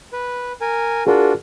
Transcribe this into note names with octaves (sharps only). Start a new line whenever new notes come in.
B4
A#4 G#5
D4 F4 F#4 G#4 A#4